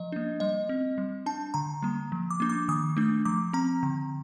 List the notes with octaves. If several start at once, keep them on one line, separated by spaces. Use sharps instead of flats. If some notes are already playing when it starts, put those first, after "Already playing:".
Already playing: F3 D#5
A#3 D4
G3 D#5
C4
G3
D4 A5
D3 A#5
G3 A#3
F3
D6
A#3 D4
D6
D#3 D#6
A3 D4
F3 D6
C4 A#5
D3